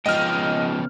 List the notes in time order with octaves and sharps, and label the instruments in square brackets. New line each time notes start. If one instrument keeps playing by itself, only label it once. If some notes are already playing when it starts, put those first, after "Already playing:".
[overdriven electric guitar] G#2 F3 [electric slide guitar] C#3 B3 G5 [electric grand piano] D#5 F6